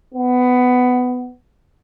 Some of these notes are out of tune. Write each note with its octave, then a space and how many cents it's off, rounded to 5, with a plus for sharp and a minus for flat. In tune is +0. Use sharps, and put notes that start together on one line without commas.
B3 +15